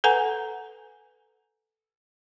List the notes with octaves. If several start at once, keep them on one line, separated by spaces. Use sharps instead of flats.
A4 B4 F#5 G#5 A#5